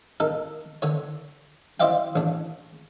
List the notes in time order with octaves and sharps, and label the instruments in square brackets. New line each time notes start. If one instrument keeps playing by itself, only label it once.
[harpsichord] D#4 A4 A#4
D3 C#5
E4 C5 D5 D#5 F5 G5
A1 D4